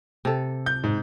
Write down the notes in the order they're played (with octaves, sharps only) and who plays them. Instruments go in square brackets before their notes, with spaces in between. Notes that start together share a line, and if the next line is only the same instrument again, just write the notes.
[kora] C3 A4
[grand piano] G6
G#2